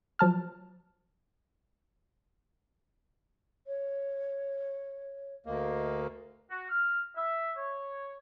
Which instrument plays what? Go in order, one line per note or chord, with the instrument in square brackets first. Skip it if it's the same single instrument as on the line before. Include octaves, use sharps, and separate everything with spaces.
[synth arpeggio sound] F3 F#3 A5 F6
[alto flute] C#5
[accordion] D2 A#3 [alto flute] D#5
[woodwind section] F#4
F6
E5
C#5